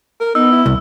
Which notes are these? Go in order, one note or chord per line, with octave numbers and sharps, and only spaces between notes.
A#4
B3 D#4 E6
E4
C2